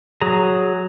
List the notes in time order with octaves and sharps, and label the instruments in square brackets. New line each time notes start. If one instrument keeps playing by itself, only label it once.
[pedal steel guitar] F#3 G#4 A#5